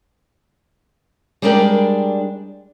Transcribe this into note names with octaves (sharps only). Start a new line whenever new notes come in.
G3 G#3 D4 A#4 D5 G5